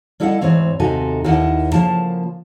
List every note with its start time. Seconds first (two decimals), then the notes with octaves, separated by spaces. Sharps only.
0.20 G3 E4 A4 D#5 F5 F#5
0.41 D2 G#2 E3 C4 C#5
0.80 D#2 C3 D#4 F#4 A4 G#5
1.24 D#2 D#3 E4 F#5
1.73 C#3 F3 A#3 A5